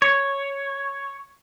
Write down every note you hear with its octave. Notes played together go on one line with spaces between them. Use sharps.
C#5